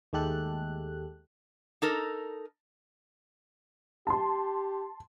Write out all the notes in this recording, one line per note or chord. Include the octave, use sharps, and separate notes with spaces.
D#2 G#3 A3 G4 A4 F#6
D#4 A4 A#4
G4 A5 C6